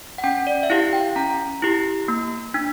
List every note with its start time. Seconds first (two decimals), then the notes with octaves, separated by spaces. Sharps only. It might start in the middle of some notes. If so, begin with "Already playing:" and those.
0.18 F#5
0.24 C#4 G5
0.47 D5
0.63 E5
0.70 E4 G4 F5
0.93 G5
1.16 C#4 A#5
1.62 E4 G4
2.08 A#3
2.54 D4